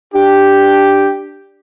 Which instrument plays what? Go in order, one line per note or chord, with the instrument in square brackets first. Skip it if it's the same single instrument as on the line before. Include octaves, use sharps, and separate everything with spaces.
[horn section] D4 G4